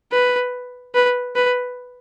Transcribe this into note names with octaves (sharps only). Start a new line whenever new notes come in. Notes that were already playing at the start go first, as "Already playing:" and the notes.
B4
B4
B4